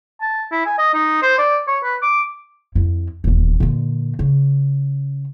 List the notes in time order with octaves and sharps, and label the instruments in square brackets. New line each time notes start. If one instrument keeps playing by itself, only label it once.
[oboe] A5
E4
G#5
D#5
D#4
C5
D5
C#5
B4
D6
[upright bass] F2 E4
D#1 E2
A#2 D3
C#3